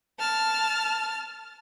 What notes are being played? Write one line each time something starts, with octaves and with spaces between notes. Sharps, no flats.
A5 F6